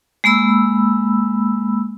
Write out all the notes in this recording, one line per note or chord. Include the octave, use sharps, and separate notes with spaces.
G#3 A#3 B5 E6